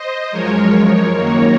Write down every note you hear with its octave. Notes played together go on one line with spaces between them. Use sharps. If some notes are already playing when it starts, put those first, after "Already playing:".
Already playing: C5 D#5
F#2 F3 G#3 A#4 C#5
F#2 D#3 F#3 A#3 A#4 C#5